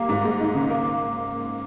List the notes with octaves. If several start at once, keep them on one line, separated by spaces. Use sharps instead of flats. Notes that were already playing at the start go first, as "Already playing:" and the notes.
Already playing: G3 A#3
G#2
G#3
D#4
C#3
A#3